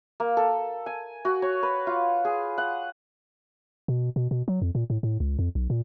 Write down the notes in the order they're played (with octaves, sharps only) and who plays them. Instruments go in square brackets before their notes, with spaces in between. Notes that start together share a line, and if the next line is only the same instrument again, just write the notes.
[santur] A#3
A4
G#5
F#4
C#5
B4
F4
G#4
F#5
[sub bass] B2
B2
B2
F#3
F2
A#2
A2
A2
C#2
F2
B1
A#2